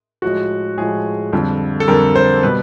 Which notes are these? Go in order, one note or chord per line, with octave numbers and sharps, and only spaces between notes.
A2 F3 G#3 F#4
A2 F3 G#3 G#4
F2 D3 G3
A4
F2 D3 G3 A#4
C5
B2 G3 B4